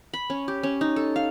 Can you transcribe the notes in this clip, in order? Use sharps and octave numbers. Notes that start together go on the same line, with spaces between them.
B5
C#4
G4
C#4
D#4
A4
F5